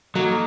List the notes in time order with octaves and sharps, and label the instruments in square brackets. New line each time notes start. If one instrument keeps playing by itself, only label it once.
[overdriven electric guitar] F#3 [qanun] A#3 D#4 F#4 A4